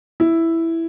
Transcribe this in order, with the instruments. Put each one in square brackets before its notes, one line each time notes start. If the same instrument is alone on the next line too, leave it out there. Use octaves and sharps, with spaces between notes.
[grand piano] E4